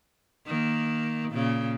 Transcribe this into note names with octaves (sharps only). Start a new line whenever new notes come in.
D#3 A#3
A#2 C#3